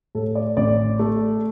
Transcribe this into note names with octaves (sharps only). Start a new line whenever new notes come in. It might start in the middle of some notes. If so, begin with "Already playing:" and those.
A2 A4
D5
A1 D5
A3